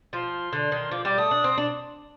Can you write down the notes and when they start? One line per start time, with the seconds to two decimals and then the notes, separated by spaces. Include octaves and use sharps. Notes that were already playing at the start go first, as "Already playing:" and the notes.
0.13 F3 C6
0.53 D3
0.72 D#3
0.91 F3 D6
1.05 G3 D6
1.17 A3 D#6
1.31 D4
1.44 C4
1.58 D4